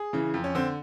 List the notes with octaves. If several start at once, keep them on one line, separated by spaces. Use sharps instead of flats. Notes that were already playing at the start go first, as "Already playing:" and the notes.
Already playing: G#4
C#3 E3
F2
C#4
D3 C4